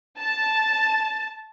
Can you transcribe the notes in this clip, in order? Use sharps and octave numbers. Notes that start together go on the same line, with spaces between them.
A5